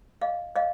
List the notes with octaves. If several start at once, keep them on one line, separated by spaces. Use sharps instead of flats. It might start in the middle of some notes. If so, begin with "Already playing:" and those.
D#5 F5
D#5 F5